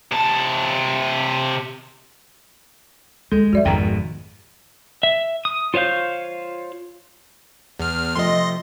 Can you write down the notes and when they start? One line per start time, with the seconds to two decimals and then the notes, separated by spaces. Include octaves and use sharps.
0.12 C3 A5
3.32 D#2 G#3 A4
3.53 F#2 F#4 D5 E5
3.65 G#1 F2 G#2 B2 G5 A#5
5.03 E5
5.45 D#6
5.74 F4 C5 C#5 F5 G6
7.79 E2 F6
8.15 C3 F3 A3 D#5 C6